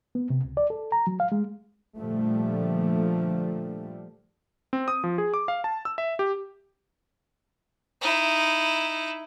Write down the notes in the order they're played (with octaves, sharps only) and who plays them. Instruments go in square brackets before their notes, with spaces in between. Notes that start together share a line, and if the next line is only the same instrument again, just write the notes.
[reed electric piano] B3
C3
C#2
D5
A4
A#5
F#3
F5
G#3
[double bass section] A#2 D3 F3 G3 A3
[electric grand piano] C4
D#6
F3
G#4
D6
F5
A5
E6
E5
G4
[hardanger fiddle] D#4 E4